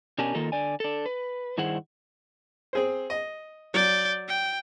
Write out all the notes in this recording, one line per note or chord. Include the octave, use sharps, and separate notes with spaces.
B2 C#4 D4 G4 A#4 G#5
D#3 A#3 F4 A4 A#4
D3 D5 G#5
D4 A4
B4
G2 D#3 E4 G#4 C5 F#5
C4 G#4 C5
D#5
F#3 D5 G6
G5